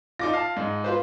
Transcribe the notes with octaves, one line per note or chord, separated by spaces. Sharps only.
D#4 F4 D6 A#6
F5 A5
G#2 D#4
F4 B4 C5